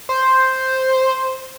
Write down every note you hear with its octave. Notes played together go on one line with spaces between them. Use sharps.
C5